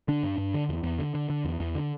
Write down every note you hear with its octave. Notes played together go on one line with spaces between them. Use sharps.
D3 D4
G2
G2
D3
E2
E2
D3
D3
D3
E2
E2
D3